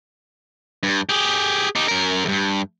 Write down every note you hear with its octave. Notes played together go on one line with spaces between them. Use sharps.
G2
G4 G#4
D#4 G4
F#2 A#4
E2 G2